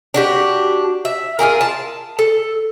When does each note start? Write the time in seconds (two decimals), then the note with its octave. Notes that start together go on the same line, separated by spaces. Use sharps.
0.14 D4 F#4 G4
1.05 E5
1.39 F4 G4 G#4 A#4
1.61 A5
2.19 A4